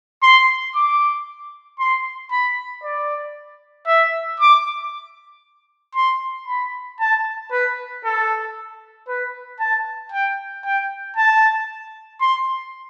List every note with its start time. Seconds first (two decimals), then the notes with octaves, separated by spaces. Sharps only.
0.23 C6
0.75 D6
1.79 C6
2.31 B5
2.83 D5
3.87 E5
4.40 D6
5.95 C6
6.48 B5
7.00 A5
7.52 B4
8.05 A4
9.08 B4
9.60 A5
10.12 G5
10.64 G5
11.16 A5
12.21 C6